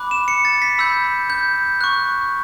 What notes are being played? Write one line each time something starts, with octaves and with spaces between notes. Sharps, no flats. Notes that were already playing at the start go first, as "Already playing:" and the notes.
Already playing: B5 D6 F#6
E7
C#7
A6
B6
B5 E6 G6
G6
C#6 F#6